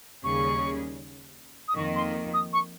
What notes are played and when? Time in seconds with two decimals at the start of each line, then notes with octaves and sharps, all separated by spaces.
0.24 D#2 C#3 G3 C#4 G#4 C#6
1.68 D#6
1.76 F2 D#3 A#3 C#6
1.96 C6
2.34 D#6
2.53 C#6